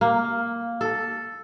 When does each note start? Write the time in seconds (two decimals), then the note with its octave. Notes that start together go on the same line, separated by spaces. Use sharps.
0.01 A#3
0.81 A4